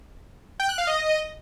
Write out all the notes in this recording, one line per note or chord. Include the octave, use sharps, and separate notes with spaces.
G5
F#6
F5
D#5